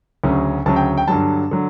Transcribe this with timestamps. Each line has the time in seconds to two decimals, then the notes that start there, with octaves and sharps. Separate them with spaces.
0.24 D2 C#3 F#3 C#4
0.66 D2 C#3 F#3 C#4 A5
0.76 G5
0.97 G5
1.08 G2 D3 F#3 A5
1.51 D3 F#3